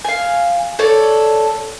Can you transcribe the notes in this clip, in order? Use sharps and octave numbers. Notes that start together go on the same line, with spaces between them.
F5 G#5
A4 C#5 D5